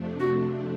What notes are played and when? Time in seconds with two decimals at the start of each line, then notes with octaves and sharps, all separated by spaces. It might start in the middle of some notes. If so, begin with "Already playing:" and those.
Already playing: F2 C3 F3 A3 D4
0.20 F#4